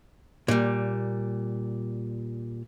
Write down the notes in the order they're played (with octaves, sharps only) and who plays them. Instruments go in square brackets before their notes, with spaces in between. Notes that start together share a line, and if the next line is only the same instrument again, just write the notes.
[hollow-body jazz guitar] A#2 G3